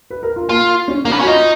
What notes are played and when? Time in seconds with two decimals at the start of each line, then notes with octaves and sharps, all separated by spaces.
0.10 B4
0.23 A#4
0.36 F4
0.49 A#3 F4
0.88 C#4
1.05 A#3 C#4
1.12 B3
1.20 C#4 F#4
1.27 D#4 F4